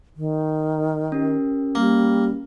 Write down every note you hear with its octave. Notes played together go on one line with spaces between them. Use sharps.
D#3
C#4 G4 A#4
G3 A#3